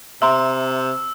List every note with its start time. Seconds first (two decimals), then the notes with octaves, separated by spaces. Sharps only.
0.22 C3 E5 A#5 C6 E6